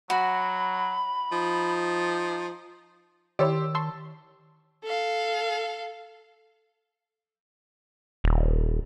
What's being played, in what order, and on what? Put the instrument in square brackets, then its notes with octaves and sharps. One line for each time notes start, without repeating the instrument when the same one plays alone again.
[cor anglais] F#3 [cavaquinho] F#4 [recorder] B5
[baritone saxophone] F3 [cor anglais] D#4
[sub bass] D#3 [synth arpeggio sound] E4 C#5 D5 [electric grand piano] G4 C6 E6
[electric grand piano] A5 [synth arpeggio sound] C6 C#6 E6
[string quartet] A4 F5
[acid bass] D#1